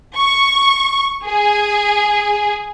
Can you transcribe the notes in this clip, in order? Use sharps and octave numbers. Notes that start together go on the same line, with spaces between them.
C#6
G#4